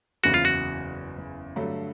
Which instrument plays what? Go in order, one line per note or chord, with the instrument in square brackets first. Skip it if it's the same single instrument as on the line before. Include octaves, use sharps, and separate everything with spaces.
[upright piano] F#1 E2 C#3 [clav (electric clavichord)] F#4
[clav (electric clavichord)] F4
F#4
[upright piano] G2 D3 F#3 A3